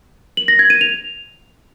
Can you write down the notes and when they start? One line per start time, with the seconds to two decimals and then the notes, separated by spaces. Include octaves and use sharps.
0.37 F#7
0.48 A#6
0.59 G#6
0.70 D#7
0.81 F7